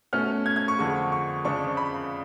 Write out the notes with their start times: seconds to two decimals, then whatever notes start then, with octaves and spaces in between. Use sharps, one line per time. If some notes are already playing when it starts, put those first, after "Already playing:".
0.13 B2 A3 C#4 F6
0.46 G#6
0.56 G#6
0.68 C#6
0.79 F2 D3 G#3 C#6
1.12 C#6
1.45 F2 C#3 G#3 D4 C#6
1.77 B5